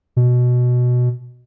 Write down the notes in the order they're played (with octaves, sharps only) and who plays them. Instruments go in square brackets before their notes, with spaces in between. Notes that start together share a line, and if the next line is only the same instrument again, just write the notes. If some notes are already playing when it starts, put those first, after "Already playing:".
[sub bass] B2